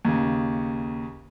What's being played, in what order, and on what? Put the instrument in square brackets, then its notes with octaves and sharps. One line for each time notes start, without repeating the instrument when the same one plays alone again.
[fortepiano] D#2 C#3